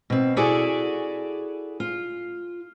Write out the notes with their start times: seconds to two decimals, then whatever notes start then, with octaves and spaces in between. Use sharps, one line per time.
0.10 B2 C4
0.37 E4 F#4 G#4 A4 D5
1.80 F4